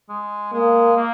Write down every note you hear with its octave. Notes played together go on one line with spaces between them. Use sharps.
G#3
G#3 A#3
A#3